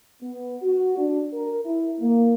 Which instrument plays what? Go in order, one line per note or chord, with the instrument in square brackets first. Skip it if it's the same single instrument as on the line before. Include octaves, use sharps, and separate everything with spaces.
[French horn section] B3
F#4
D4
A#4
E4
A#3